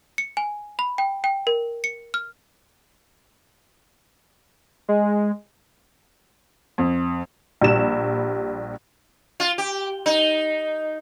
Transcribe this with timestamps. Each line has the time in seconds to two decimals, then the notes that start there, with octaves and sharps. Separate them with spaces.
0.18 C#7
0.37 G#5
0.79 B5
0.98 G5
1.24 G5
1.47 A#4
1.84 C#7
2.14 F6
4.88 G#3
6.78 F2
7.61 A#1 G3 E7
9.40 F4
9.58 G4
10.06 D#4